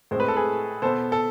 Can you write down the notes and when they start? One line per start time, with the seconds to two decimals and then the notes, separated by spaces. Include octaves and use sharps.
0.11 A2 G#3 C4 C5
0.20 B4
0.28 A4
0.36 G#4 B4
0.82 B2 B3 A4 C5
1.12 A4